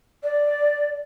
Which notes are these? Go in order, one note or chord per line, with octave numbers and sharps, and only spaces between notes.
D5